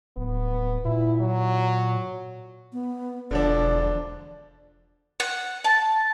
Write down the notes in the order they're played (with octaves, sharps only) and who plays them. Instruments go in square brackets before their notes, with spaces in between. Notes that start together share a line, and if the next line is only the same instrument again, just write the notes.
[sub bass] D1 [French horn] B3
[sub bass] A#2 [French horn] E4
[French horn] F#3
[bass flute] B3
[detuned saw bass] E1 [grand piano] D3 F3 D4 [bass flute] D5
[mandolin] F#5
A5